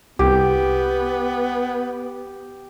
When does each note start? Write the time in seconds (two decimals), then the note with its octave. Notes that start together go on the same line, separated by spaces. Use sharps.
0.19 C2 B3 G4